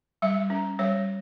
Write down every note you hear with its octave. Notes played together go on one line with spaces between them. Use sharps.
G3 E5
C#4
G3 C#5